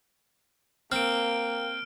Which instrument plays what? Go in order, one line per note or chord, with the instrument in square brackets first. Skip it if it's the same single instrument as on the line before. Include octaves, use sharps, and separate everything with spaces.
[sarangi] A#3 [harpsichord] C4 [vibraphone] A#4 F5 G5 [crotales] F6 D7